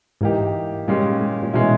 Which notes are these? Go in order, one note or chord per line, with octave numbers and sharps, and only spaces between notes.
G#2 E3 A#3 D#4 G4
G2 A#2 G#3 C#4 G4
G#2
A#2
B2 E3 G#3 C#4 E4